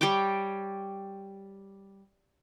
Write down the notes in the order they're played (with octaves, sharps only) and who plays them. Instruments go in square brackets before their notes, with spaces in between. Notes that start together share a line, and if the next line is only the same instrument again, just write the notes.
[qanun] G3 C#5 G5 D6